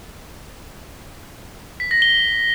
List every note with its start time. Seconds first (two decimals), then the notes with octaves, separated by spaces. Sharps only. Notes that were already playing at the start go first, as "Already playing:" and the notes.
1.80 B6
1.91 A#6
2.02 G7